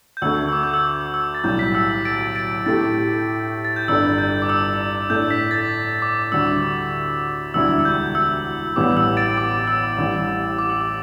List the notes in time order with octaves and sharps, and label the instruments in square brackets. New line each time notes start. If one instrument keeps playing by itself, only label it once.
[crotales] G6
[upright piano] D2 D3 A3 [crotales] E6
[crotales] E6
D6
G6
E6
D6
E6
A6
[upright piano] B1 A2 G3 [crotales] G6
[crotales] B6
E6
E6
A6 D7
A6 D7
[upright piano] A2 A3 G4 [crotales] A6
[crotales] A6
G6
[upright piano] G1 G2 G3 D4 A4 [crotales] E6
[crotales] G6
D6
E6
[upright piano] A2 A3 D4 [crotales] G6
[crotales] B6
A6
D6
[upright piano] D2 D3 G3 [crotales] E6
[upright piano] E1 D2 D3 G3 E4 [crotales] E6
[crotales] E6
G6
E6
[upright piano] A1 A2 G3 B3 G4 [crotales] D6
[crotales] E6
A6 D7
D6
E6
[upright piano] A1 A2 G3
[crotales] D6
E6
D6